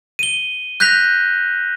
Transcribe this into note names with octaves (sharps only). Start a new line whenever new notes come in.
D#7 G7
F#6 G6 A#6 B6 F7